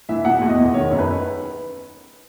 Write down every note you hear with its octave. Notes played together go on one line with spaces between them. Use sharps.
E3 E5
B2 F#5
E2
D#5
E2
D#3 C#5
F#2
B4